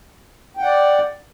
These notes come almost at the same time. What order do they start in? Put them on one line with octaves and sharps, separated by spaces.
G5 F#5 D5